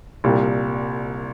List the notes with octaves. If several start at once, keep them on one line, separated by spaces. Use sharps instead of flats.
C2 A#2 G3